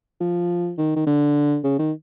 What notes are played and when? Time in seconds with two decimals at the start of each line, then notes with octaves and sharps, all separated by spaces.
0.20 F3
0.78 D#3
0.96 D#3
1.06 D3
1.64 C#3
1.79 D#3